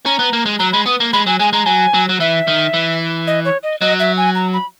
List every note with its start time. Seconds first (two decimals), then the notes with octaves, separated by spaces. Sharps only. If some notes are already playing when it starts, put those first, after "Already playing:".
0.06 C#4 A#5
0.19 B3
0.33 A#3
0.46 G#3
0.59 F#3 A#5
0.72 G#3 B5
0.86 B3 D#6
1.00 A#3
1.13 G#3 B5
1.26 F#3 G#5
1.39 G#3 G#5
1.53 G#3 A#5
1.66 F#3 G#5
1.94 F#3
2.09 F#3
2.20 E3 E5
2.47 D#3
2.74 E3
3.27 D#5
3.45 C#5
3.63 D#5
3.81 F#3 D#5
4.00 E5
4.17 G#5
4.35 A#5
4.53 B5